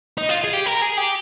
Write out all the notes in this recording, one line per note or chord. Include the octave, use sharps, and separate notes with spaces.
D#4
F4
G#4
G4
A#4
G#4
G4